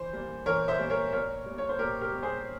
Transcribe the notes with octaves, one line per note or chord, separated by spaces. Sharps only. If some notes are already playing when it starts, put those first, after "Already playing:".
Already playing: E3 C5
G3 A#3
E3 A#4 C#5
C5 E5
G3 A#3
A#4 C#5
A#2 A#4 C#5
G3 A#3
C#5
C5
A#2 G4 A#4
G4 A#4
G3 A#3
G#4 C5